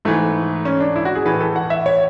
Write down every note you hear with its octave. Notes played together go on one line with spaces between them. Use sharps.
G#2 E3 A3
C#4
D4
E4
F#4
G#4
A2 E3 B4
A4
F#5
E5
C#5